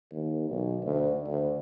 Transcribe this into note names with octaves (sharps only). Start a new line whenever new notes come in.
D#2
B1
D2
D2